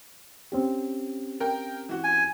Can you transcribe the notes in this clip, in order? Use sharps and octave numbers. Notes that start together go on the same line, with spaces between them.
C4 C#4 G4
A#4 G5
E3 F#4
G#5